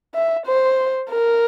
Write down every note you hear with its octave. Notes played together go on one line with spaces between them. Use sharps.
E5
C5
A#4